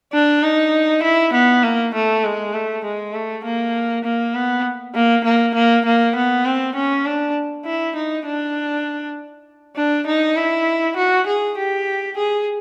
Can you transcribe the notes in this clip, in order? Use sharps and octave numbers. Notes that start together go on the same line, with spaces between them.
D4
D#4
E4
B3
A#3
A3
G#3
A3
G#3
A3
A#3
A#3
B3
A#3
A#3
A#3
A#3
B3
C4
C#4
D4
E4
D#4
D4
D4
D#4
E4
F#4
G#4
G4
G#4